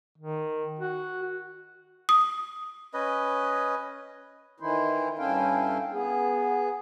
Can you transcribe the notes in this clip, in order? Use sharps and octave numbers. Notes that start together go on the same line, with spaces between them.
D#3
F#4
D#6
C#4 B4 D#5
D#3 E3 E4 C5
G2 C#4 E4 A4 F5 G5
B3 G#4